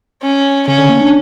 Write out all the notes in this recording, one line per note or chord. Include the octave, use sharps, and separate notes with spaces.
C#4
C#3 C#4
D3
A#3
D4